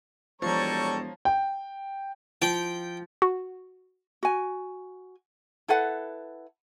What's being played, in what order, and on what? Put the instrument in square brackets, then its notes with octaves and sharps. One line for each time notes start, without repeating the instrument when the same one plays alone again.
[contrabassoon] E1 [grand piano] F3 [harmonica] G3 A4 C#6 [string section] C#5 A#5
[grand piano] G5
[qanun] F3 [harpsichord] G5
[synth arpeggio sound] F#4
[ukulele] F#4 G#5
E4 A4 B4 F#5